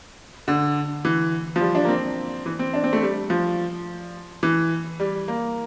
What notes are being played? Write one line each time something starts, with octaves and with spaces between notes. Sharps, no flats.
D3
E3
F3
G3
D4
A#3
C4
E3
C4
D4
C4
A3
G3
F3
E3
G3
A#3